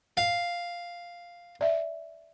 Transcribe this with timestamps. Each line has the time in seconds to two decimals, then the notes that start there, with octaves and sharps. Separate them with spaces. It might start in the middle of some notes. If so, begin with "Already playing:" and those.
0.17 F5
1.61 D5 E5